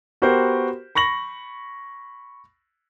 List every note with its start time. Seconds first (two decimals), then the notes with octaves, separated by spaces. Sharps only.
0.22 B3 F#4 G4 A#4 C5
0.95 B5 C#6 A#6 F#7